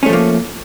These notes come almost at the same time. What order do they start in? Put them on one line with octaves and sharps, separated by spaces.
C#4 A3 F3 A#3